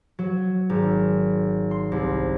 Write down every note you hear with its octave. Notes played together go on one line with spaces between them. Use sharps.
F#3
G#1
C6
C2